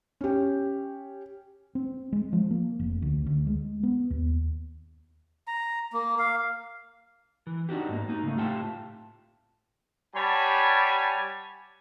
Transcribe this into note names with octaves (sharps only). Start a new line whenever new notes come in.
C#4 G4
C4
G#3
F3
A#3
F1
D2
D2
G#3
B3
D#2
A#5
A#3
F5
E3
D4 D#4 F#4 G4
G#2 A#3
A#3 D#4
C#3 A3
A2 F4 G4 G5 A5
G3 C#5 F#5 G#5 A5 B5